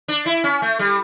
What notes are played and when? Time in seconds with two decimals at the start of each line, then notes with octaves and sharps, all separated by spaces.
0.08 D4
0.26 E4
0.44 C#4
0.62 A3
0.79 G3